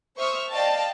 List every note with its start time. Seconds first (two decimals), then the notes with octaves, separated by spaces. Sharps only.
0.17 C5 E5 C#6 D#6 F6
0.51 D5 D#5 F5 G5 A5